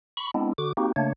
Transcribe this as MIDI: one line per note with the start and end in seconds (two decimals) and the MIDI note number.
0.17 0.31 83
0.17 0.31 85
0.34 0.53 56
0.34 0.53 59
0.34 0.53 60
0.34 0.53 62
0.34 0.53 64
0.58 0.73 50
0.58 0.73 66
0.58 0.73 86
0.77 0.92 58
0.77 0.92 60
0.77 0.92 63
0.77 0.92 66
0.77 0.92 67
0.96 1.13 49
0.96 1.13 57
0.96 1.13 58
0.96 1.13 62
0.96 1.13 73